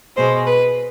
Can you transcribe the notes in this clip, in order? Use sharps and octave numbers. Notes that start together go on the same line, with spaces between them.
B2 G#3 C5
B4